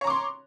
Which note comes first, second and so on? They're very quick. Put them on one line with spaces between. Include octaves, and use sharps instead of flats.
C#5 A#5 D6 C6